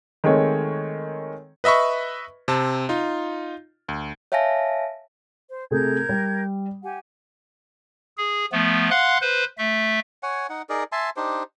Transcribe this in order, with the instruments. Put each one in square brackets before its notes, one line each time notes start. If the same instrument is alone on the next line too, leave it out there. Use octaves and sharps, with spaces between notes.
[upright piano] D#3 G#3 A3 C4 C#5
[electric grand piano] B4 D#5 E5 B5 C#6
C3 C4 A5
D#4 F4
D2
[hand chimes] C#5 E5 F5 G#5 A5 A#6
[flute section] C5
[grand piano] C3 A3 G#4 [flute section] A#4 G6 G#6
[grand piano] G3
[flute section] G4 F#5 G#5
[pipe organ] G#4
F3 A3 B3
F5 F#5 C6 F#6
B4 C5
A3 E5
[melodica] C#5 F#5 G#5
D#4 F#5
D#4 G#4 A#4 D5
E5 G#5 A5 C6
D4 D#4 G4 C5